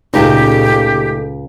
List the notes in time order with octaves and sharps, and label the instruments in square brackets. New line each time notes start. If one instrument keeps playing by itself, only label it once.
[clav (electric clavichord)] C#2 [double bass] A#2 C#3 [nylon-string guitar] A3 D#4 [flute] G4